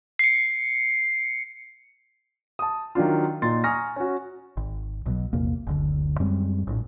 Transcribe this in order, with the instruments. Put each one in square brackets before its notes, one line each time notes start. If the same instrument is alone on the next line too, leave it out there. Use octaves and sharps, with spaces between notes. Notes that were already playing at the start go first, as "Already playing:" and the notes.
[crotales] C7 C#7
[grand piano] A5 D#6
D#3 F#3 D4 F4
A#2 D#4 C6 A6
G#5 A#5 C#6 D#6 F6 A#6
C#4 F#4
[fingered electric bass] G#1
B1 B2 F3 F#3
A#1 E2 C3 A#3
F#1 D2 D3
F#2 G3 G#3 C4
A#1 A2